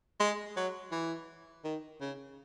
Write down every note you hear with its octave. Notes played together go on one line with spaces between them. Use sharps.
G#3
F#3
E3
D#3
C#3